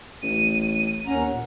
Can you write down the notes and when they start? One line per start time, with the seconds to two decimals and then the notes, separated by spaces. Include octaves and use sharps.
0.22 A1 D#7
1.06 D#2 C#4 F#5 A#5
1.30 A#2